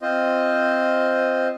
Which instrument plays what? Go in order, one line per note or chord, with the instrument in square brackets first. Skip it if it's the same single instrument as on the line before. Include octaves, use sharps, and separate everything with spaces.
[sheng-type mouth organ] C4 F4 C5 D#5